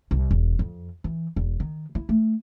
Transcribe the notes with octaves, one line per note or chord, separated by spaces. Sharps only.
C2
E1
F2
E3
E1
D#3
E4
A3